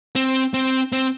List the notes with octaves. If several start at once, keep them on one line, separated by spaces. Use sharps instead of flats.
C4
C4
C4